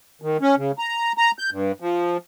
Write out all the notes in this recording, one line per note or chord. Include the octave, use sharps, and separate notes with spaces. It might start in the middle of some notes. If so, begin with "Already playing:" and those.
D#3
C#4
C#3
A#5
A#5
G6
G2
F3